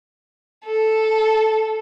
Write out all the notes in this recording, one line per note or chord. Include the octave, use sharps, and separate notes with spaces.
A4